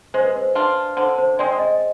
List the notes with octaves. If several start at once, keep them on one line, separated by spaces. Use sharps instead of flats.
G#3 C5
B4
C5
D4 F4
D3 C5
C5
G#3 C4 D5
D#5